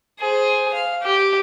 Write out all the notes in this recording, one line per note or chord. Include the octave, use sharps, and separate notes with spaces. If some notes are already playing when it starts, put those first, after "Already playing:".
G#4 C5
F5
G4